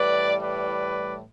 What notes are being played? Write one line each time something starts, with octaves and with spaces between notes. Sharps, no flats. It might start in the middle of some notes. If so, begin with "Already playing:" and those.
Already playing: A2 E3 G3 B4 D5
B4 D5